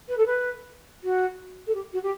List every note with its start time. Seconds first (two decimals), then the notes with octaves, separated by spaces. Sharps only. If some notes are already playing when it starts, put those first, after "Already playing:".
0.08 B4
0.17 A4
0.26 B4
1.03 F#4
1.67 A4
1.74 G4
1.93 F#4
2.03 G4